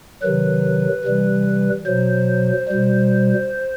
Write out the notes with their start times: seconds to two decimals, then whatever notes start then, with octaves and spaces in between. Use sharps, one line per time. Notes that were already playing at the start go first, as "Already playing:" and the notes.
0.23 C3 D#3 F#3 B4
1.05 C3 E3 G3
1.86 B2 F#3 C5
2.69 B2 G3